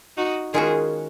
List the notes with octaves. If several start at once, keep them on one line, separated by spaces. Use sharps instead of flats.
D#4 F#4
D#3 G#3 C#4 F4 F#4 G#4